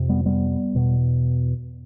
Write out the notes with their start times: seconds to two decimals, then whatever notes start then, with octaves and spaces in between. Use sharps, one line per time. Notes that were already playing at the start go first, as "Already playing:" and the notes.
Already playing: F2 C3
0.09 G3 B3
0.26 G3 B3
0.75 E2 B2